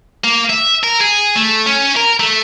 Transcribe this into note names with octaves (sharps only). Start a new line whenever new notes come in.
A#3
E5
A#4
G#4
A3
C#4
A#4
A3